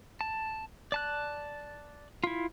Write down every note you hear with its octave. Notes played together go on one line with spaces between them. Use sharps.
A5
D5 A5 F#6
E4 F4